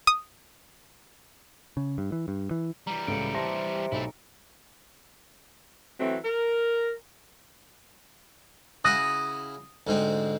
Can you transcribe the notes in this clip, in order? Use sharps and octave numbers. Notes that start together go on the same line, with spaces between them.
D#6
C#3
G2
E3
G2
E3
E3 G3 A#5
C#2 A2 C#7 D7
C3 A5 C6 A#6
B1 A3 E4
E3 F#3 A3 C4
A#4
C#3 E4 F#4 D#6 F#6 A#6
D2 G#2 C4